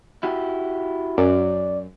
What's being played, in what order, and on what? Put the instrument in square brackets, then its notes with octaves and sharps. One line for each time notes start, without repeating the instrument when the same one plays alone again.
[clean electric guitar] E4 F#4 G4
[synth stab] F#2 [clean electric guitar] D5